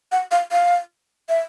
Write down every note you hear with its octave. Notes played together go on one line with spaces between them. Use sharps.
F#5
F5
F5
E5